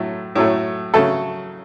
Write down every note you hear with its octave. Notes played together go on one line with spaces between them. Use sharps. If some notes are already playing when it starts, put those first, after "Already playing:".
Already playing: A2 F#3 A3
A2 F#3 A3
C#3 F#3 A3 A4